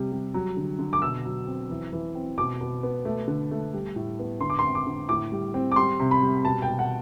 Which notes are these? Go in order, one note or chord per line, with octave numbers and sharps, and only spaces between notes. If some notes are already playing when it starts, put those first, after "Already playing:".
Already playing: C3 G3
G3
F#3
D3
D3
D6
B2 E6
F#3
C4
E3
E3
C4
B2 D6
B2
B3
A3
D3
A3
G3
A2
B3
D3 C6
D6
C6
C4
D6
D3
A2 D6
G3
C4
D6
G3 C6
C3
B5
G3
B2 A5
G5
B2
F#5